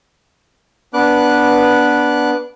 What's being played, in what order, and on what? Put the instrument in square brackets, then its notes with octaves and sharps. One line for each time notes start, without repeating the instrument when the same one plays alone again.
[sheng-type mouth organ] B3 D4 B4 D6 F#6